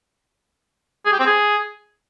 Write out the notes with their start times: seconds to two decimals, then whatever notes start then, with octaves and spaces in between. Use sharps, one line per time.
1.06 G#4
1.13 G4
1.20 C4
1.26 G#4